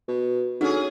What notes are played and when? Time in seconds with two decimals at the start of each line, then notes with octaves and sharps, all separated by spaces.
0.08 B2
0.61 D3 C#4 D#4 F#4 G#4